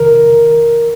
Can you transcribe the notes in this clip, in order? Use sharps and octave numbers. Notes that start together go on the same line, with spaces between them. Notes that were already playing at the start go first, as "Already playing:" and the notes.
Already playing: F2 C3 D#3 A#4